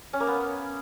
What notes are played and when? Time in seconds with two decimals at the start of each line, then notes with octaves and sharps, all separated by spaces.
0.13 C#4
0.20 A#3
0.27 B3